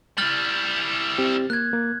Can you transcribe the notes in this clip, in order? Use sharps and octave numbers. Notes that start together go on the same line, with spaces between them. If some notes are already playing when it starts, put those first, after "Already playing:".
G3 E4 F6 A6 F#7
C4 G4
A#3 F#6 G#6
A#3